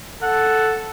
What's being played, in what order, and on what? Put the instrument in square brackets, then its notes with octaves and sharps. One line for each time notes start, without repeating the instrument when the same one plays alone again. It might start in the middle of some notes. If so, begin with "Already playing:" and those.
[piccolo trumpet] A4 [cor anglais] F#5